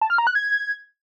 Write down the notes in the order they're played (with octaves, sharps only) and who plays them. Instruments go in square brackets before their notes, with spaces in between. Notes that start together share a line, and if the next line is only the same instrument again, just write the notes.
[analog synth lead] A5
F6
A#5
F#6
G#6